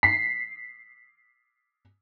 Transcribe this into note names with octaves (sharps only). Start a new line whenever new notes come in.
B6 C7